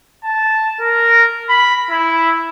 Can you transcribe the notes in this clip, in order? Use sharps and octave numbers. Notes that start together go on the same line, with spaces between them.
A5
A#4
B5
E4